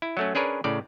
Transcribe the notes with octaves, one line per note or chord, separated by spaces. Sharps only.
E4
F#3 A3 C#4
C#4 D4 G#4 A#4 B4 C#5
A2 C#3 D5